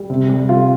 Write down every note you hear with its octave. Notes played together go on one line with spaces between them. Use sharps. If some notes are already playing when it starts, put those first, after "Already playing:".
Already playing: G3
C3
G3
C3 F4